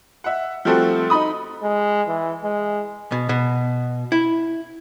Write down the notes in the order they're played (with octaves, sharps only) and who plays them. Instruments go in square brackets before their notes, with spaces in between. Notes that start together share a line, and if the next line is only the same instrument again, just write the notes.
[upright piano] E5 F#5
F3 G3 A3 C4 F#4 A4
D#4 D#5 B5 D#6
[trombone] G#3
E3
G#3
[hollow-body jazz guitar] B2
B2
E4